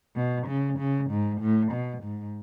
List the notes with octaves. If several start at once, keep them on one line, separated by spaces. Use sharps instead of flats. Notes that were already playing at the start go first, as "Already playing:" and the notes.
B2
C#3
C#3
G#2
A2
B2
G#2